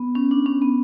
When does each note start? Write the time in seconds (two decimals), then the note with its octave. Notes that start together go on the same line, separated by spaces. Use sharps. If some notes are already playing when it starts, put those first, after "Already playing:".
Already playing: B3
0.15 C#4
0.31 D4
0.46 C#4
0.62 B3